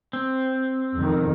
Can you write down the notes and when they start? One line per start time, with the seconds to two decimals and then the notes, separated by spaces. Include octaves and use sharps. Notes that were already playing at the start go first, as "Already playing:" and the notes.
0.13 C4
0.97 F2 D#3